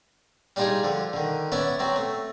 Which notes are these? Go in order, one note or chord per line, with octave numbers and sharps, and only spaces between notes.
G3 D4 D#4 F4 G4 G#4
D3 F3
D3 D#3
B3 C#4 D5 E5
F#3 C4 F#4
A3